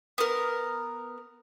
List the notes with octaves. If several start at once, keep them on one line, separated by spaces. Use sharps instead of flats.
B3 A#4